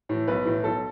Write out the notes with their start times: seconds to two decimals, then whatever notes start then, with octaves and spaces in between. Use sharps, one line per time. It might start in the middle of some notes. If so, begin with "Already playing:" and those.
0.09 A2 E3
0.28 B1 B4
0.45 A2 E3
0.63 B1 A4